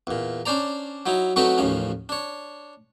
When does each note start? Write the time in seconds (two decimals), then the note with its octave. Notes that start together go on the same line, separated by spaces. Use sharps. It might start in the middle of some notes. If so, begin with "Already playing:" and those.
0.07 E2 A#2
0.46 C#4 D4 C5 D5 A#5
1.06 F#3 D#4 E4
1.36 F#3 A3 C4 D#4 F#4 B4
1.58 A1 D#2 F3 C#4
2.09 D4 C#5